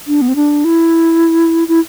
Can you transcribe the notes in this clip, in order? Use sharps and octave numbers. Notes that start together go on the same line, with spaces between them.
D4
B3
C4
D4
E4
E4